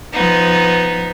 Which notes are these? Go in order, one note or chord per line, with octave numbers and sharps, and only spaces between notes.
F3 B3 D#4